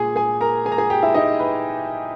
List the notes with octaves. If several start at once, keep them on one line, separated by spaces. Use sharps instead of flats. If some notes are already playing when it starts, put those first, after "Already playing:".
Already playing: A#2 G#4 G#5
G#4 G#5
A#4 A#5
G#4 G#5
A#5
G#4 G#5
G4 G5
E4 E5
D#4 D#5
B4